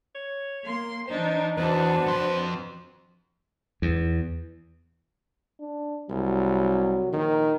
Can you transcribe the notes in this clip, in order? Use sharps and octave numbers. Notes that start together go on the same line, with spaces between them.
C#5
A#3 C6
E3 D4 D#4 C5
E2 D4 F#4 B4 C5
F2 C6
E2
D4
C2 F#3
A#1 D#3